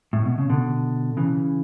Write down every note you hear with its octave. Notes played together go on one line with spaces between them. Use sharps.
A2
B2
C#3
B2 D3
C#3 E3